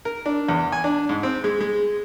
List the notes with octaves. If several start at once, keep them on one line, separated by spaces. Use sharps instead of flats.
A#4
D4
E2
G#5
D4
G#2
C4
G#3
G#3